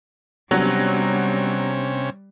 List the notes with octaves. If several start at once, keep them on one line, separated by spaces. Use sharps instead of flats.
C3 F#3 G3 B3 C#4 D4 G4